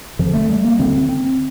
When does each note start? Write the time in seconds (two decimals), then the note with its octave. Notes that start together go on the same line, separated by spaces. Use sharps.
0.19 F2 D3 F3
0.34 A3
0.49 G3
0.64 A#3
0.79 D2 D3 C4
1.09 C4